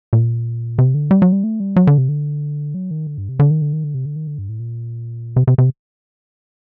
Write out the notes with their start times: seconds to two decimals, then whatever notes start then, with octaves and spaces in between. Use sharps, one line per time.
0.13 A#2
0.78 C3
0.94 D3
1.11 G3
1.22 F#3
1.32 G3
1.44 A3
1.60 G3
1.76 F#3
1.87 D3
1.98 C3
2.09 D3
2.74 F#3
2.91 D#3
3.07 D3
3.18 G2
3.29 C3
3.39 D3
3.51 D#3
3.62 D3
3.73 D#3
3.84 D3
3.94 C3
4.05 D3
4.16 D#3
4.27 D3
4.38 G2
4.49 A2
4.60 A#2
5.36 C3
5.47 C3
5.58 C3